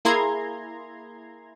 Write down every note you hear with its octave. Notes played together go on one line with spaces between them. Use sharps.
A#3 E4 G#4 A#5 C6 G#6